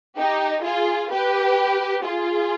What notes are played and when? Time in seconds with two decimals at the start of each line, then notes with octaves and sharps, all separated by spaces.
0.17 D#4 G4
0.64 F4 G#4
1.11 G4 B4
2.05 F4 G#4